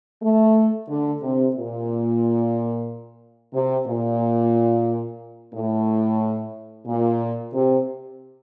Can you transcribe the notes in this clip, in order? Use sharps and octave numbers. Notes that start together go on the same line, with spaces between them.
A3
D3
C3
A#2
C3
A#2
A2
A#2
C3